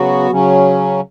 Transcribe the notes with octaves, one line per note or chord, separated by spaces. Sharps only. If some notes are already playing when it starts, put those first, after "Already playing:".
Already playing: C#3 F#3 B3 F#4
C#3 F#3 C#4